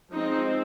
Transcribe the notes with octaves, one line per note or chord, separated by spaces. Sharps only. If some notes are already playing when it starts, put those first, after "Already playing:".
F3 G#3 C4 D#4